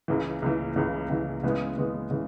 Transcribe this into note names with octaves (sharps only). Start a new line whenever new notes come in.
C#2 C#3 E3
C#2 C#3 E3
C#2 C#3 E3
C#2 C#3 E3
C#3 E3 G#3 B3
C#3 E3 G#3 B3
C#3 E3